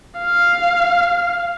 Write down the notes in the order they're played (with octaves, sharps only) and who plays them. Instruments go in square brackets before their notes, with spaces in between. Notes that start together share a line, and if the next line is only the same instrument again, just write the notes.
[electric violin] F5